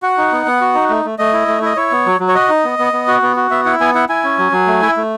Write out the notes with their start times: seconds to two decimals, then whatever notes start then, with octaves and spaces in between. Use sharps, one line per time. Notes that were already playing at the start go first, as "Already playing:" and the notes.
0.03 F#4 F#5
0.18 D#4
0.32 B3
0.47 B3
0.61 F#4
0.75 D#4
0.90 A3
1.05 A3
1.19 A3 D#5
1.33 E4
1.48 A3
1.62 E4 D#5
1.77 E4 C#5
1.92 B3
2.06 F#3
2.20 F#3
2.28 C#5
2.35 F#4 D#5
2.49 D#4
2.65 B3
2.79 B3
2.93 B3
3.08 F#4
3.22 B3
3.37 F#4
3.51 B3 E5
3.65 E4 F#5
3.80 B3 G#5
3.95 E4 F#5
4.09 E4 G#5
4.24 C#4
4.38 F#3
4.52 F#3
4.67 A3
4.82 E4
4.97 A3